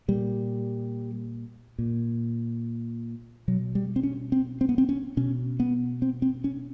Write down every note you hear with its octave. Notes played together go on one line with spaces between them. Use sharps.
A#2 G3
A#2
B2 F#3
G3
C4
C#4
C4
C4
B3
C4
C#4
B2 C#4
B3
C4
C4
C#4